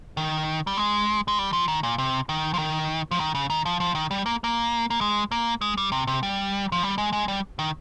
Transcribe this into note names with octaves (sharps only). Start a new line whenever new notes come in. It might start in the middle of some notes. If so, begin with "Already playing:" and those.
D#3
G3
G#3
G#3
G3
F3
D#3
A#2
C3
D#3
F3
D#3
F3
D#3
C#3
D#3
F3
F3
D#3
G3
A#3
A#3
A#3
G#3
A#3
G#3
G3
C3
C3
G3
F3
G3
G#3
G#3
G3
D#3